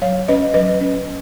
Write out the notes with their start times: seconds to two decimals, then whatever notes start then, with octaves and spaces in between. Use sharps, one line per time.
0.02 F#3 C#5 F5
0.28 C#4 B4 D#5
0.54 F#3 B4 D#5
0.81 C#4